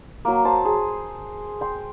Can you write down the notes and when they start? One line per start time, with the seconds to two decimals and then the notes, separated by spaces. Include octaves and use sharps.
0.25 F#3 A#3
0.45 C5 A5
0.65 G#4
1.61 G5 C6